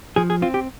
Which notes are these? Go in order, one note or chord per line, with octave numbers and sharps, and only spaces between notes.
F3 G#4
G#4
C4 F4
G4